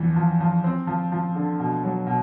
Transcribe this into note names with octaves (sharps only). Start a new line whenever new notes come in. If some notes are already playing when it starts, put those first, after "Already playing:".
Already playing: E2 E3 F3
F3
F3
C4
F3
F3
D3
B2
F#3
B2